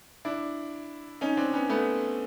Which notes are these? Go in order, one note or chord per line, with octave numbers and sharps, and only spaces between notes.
D4 E4
C#4 D#4
C4 D4
B3 C#4
A3 B3